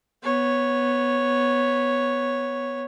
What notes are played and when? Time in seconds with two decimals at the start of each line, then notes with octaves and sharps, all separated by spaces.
0.23 B3 C#5